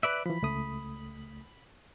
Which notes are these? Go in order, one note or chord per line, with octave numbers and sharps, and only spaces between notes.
B4 D5 E5 F#6
E3 F3 B5
C#2 A3 D#6